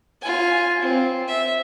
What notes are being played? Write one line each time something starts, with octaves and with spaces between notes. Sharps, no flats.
F4 G#5
C4
E5